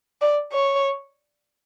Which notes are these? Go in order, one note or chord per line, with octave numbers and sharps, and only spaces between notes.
D5
C#5